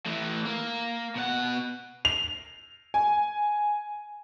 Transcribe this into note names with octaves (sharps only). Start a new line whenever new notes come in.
A2 E3
A#3
B2 F#5
F7
G#5